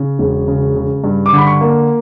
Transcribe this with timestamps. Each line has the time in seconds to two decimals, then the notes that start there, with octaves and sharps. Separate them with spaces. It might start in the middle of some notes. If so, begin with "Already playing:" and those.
Already playing: C#3
0.19 E1
0.48 C#3
0.75 C#3
1.04 G2
1.26 D6
1.33 D3 B5
1.47 C#6
1.61 A#3